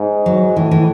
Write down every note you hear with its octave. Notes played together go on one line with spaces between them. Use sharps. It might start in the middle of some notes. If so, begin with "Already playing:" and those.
Already playing: G#2
F#3
A2 E3
E3